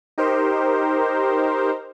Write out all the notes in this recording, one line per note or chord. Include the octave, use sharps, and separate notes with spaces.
D#4 G4 A#4 C5